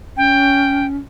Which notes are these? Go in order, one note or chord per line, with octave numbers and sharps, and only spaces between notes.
C#4 G5